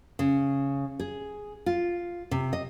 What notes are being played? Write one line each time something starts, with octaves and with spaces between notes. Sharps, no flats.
C#3
G#4
F4
C3
D#5